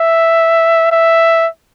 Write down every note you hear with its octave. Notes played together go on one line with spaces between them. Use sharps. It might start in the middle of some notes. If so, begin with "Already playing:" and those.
Already playing: E5
E5